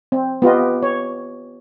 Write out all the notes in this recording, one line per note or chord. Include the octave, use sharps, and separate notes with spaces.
C4
B3 F4 G4 D#5
C#5